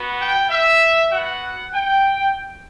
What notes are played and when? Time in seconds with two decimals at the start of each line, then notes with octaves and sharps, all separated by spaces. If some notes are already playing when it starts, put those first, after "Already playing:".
Already playing: B3 F#4
0.20 G5
0.50 E5
1.13 B3 F#4 F#5
1.74 G5